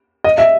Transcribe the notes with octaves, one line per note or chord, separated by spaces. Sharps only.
D#5
E5